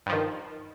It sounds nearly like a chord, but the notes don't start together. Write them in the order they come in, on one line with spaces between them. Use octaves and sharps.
G2 F3 D#3